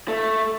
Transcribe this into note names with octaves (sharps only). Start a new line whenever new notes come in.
A3